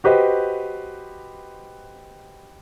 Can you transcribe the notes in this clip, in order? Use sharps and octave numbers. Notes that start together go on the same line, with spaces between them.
F#4 G4 B4 C5 D#5